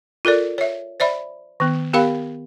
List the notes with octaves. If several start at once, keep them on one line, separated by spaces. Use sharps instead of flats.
F4 A4 A#4 D5
C#5 E5
C5 D5 E5 B5
D#3 B3
B3 G4 A#4 F5 B5